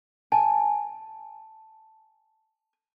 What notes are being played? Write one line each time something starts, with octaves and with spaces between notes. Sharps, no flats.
G#5 A5